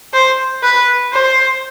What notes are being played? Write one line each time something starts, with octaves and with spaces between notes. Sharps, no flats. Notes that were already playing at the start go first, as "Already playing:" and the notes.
C5
B4
C5